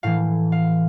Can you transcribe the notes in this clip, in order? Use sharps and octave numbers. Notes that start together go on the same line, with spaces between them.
A2 E3 F5
F5